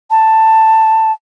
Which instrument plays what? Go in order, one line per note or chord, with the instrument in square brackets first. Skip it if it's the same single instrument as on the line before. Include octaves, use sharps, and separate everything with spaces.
[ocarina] A5